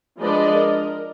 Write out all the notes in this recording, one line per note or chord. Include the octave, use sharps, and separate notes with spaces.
F3 G#3 D4 B4 D5 D#5
A#4